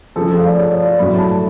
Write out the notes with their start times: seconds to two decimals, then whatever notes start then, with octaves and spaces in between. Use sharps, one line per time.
0.16 C#3 F3 A3 A4
0.27 A4
0.37 F5
0.46 D5
0.58 C#5
0.71 D5
0.85 D5
0.99 A2 F#3 A3 B5
1.19 A5